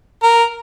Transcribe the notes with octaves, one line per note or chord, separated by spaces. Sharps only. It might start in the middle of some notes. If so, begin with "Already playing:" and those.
A#4